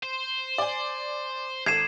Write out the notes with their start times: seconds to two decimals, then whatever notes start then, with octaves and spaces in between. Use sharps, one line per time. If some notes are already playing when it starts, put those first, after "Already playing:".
0.03 C5
0.58 D5 G#5
1.66 G#1 A4 G#6 C7 D#7 E7